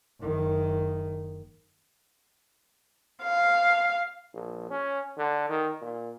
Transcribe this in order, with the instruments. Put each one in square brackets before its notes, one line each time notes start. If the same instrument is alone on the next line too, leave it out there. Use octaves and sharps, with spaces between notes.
[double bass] F#1 D#3
[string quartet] F5
[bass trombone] A#1
C#4
D3
D#3
A#2